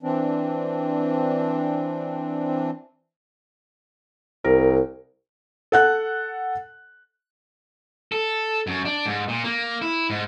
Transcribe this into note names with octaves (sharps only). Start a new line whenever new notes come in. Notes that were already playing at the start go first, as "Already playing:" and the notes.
E3 C4 D4
C2 A#4
A4 F#5 F#6
A4
F#2
D4
G#2
A#2
A#3
E4
G#2